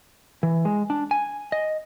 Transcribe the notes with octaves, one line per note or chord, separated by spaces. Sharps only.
E3
G#3
D4
G#5
D#5